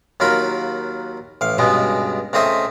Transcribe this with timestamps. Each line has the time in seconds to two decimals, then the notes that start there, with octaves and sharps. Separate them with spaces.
0.20 D#2 F#3 F4 A#4 B5
1.41 A1 F5
1.58 C#2 G2 B2 G#3 B3
2.33 C#2 A3 C4 D#5 E5 C6